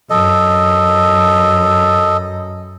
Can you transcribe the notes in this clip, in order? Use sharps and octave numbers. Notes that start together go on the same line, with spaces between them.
F#2 A4 D#5